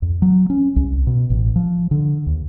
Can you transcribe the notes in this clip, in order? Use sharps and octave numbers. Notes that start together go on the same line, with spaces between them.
F2
F#3
C#4
C2
B2
A1
F3
D3
D#2